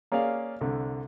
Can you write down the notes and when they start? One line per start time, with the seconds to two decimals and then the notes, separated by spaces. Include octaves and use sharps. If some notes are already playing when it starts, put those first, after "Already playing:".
0.12 A#3 C#4 G#4 D5 F5
0.61 C2 D3